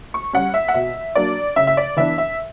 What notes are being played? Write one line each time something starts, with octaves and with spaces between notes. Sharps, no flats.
C#6
G3 C#4 F#5
E5
F#5
B2 E5
F#3 A#3 D4 D5
C#3 E5
E5
D5
E3 B3 D4 E5
E5